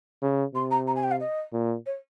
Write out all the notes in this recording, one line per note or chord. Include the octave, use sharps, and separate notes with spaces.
C#3
C3 C6
A#5
A#5
G#5
G5
F5
D#5
A#2
C#5